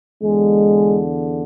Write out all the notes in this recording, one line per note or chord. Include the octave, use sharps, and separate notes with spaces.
E2 D3 G#3